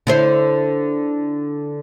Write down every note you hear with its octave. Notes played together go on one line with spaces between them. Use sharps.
D3 E4 C5